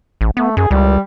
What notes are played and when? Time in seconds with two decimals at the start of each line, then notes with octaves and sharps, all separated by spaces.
0.21 A1
0.37 A3 B3
0.57 F#2 G#4
0.71 C#2 G3